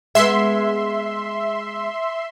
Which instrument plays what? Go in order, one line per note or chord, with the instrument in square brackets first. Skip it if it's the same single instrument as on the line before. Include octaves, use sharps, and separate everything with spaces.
[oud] G#3 B3 [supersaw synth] E5 C6